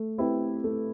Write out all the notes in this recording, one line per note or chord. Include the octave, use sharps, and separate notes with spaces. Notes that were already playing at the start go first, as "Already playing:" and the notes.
Already playing: A3
C4 E4 G4 B4
A3